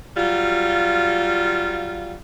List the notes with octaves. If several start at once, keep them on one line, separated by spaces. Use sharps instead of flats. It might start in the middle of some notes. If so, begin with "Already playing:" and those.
F#3 G3 F4